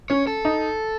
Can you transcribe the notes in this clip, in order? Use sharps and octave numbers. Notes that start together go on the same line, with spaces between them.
C#4 C#5
A4
D#4